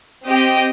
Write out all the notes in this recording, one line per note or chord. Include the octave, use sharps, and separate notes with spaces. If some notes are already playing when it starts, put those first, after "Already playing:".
C4 G4 D#5 G5